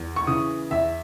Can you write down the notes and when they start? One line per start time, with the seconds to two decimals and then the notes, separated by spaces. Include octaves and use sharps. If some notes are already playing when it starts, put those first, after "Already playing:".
Already playing: E2
0.16 C#6
0.27 C#3 E3 D#6
0.71 E2 E5